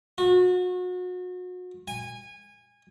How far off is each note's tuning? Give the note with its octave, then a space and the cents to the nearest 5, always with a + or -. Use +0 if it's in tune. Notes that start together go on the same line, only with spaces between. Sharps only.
F#4 -35
G#5 -20